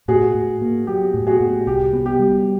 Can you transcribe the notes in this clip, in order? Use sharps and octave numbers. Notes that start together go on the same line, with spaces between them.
A2 F#4 G#4
A2
A#3
F#3 G4
A2
F#4 G#4
A2
C2 G4
B3
G4
G3